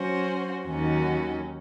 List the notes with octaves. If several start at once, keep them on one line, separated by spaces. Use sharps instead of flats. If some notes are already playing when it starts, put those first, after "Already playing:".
Already playing: F#3 C#4 F#4 C5
D#2 D#3 F#3 C#4 F#4